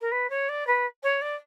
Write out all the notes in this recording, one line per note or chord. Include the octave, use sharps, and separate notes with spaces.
A#4
B4
C#5
D5
B4
C#5
D5